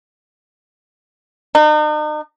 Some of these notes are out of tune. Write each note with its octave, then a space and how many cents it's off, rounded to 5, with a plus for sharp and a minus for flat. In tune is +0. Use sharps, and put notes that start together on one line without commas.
D#4 -40